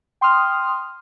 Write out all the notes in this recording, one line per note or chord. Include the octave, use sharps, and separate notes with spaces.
G5 C6 D#6 F6